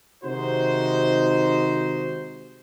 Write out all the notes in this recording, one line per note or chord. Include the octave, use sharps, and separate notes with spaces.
C3 D#3 G#3 D#4 F#4 C5